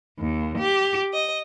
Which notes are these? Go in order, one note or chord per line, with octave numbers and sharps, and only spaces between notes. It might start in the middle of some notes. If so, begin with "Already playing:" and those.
D#2
G4
D#5